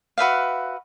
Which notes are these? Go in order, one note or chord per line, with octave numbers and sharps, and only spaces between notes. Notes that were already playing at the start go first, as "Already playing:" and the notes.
F#4 B4 E5 F5